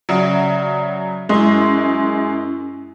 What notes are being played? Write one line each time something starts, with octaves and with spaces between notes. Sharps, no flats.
C#3 F#3 D5 E5
F#2 G#3 C#4 E4